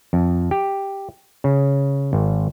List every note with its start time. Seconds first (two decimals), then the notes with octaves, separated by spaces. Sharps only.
0.13 F2
0.51 G4
1.44 C#3
2.13 G#1